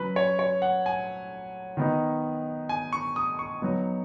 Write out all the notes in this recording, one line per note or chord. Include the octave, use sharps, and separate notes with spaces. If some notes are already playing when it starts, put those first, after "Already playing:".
Already playing: F#3 C#4 B4
C#5
C#5
F#5
G#5
D#3 B3 D#4
G#5
C#6
D#6
C#6
F#3 B3 D#4